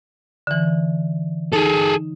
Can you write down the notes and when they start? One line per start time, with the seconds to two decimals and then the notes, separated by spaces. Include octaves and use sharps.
0.47 D3 E3
1.53 D#4 G#4 A4